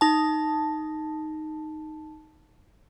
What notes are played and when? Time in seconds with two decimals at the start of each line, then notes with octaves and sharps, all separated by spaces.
0.01 D#4 A5